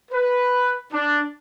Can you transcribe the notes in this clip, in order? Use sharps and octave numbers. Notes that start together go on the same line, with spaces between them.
B4
D4